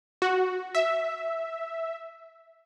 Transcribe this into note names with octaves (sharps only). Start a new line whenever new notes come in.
F#4
E5